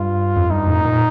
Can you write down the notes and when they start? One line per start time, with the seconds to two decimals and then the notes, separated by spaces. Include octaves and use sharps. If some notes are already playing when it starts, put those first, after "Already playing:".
Already playing: G2 F4
0.36 F2
0.49 G2 D#4
0.67 F2 A2
0.85 A#2